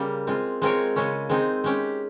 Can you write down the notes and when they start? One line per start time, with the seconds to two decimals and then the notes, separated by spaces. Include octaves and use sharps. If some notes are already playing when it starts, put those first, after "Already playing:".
Already playing: C#3 G3 A#3 G4
0.27 G#3 C4 F4
0.62 G#3 C4 F4 A#4 C#5
0.96 C#3 G#3 C#4
1.29 G#3 C4 D#4
1.64 G#3 C#4 G4